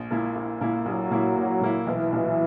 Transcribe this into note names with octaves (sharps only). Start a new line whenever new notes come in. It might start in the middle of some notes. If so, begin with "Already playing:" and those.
Already playing: A#1
A#2 A#3 E4
A#1
A#2 A#3 E4
A#1 F#3
A#2 A#3 E4
A#1
A#2 A#3 E4
B1 E3
A#2 F#3